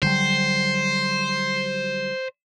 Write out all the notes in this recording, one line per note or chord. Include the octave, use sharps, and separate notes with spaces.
D3 F#3 G3 C5